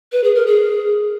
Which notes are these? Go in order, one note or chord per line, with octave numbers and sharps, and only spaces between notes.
B4
G#4
A#4
G#4